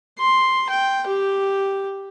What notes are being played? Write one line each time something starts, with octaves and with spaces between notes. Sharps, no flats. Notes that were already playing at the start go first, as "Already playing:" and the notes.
C6
G5
G4